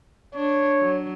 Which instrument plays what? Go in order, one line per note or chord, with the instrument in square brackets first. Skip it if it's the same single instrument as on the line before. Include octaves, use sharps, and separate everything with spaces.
[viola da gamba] D4 [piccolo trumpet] C#5
[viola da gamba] F#3